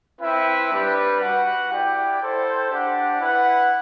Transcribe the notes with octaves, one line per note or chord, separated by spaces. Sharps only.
C4 E4 B4 E5 G5
G3 D4 G4 B4
F#4 B4 F#5
E4 G4 D5 G5
E4 A4 C5 G5
D4 G4 D5 F#5
E4 B4 F#5